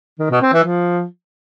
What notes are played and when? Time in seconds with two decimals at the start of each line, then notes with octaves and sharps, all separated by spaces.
0.19 D#3
0.30 B2
0.42 C4
0.53 E3
0.64 F3